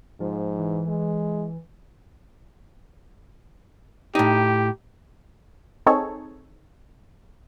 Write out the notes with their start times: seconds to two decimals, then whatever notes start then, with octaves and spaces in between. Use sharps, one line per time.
0.20 G#2 F3
0.59 E3
0.88 G#3
4.15 A2 D#4 G4
5.86 C4 D#4 G#4 A4 C#5